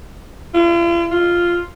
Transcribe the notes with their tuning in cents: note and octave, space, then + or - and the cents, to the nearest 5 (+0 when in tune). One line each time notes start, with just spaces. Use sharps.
F4 -45
F4 -5